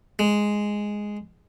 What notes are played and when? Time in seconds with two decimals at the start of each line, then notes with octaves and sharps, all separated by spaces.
0.19 G#3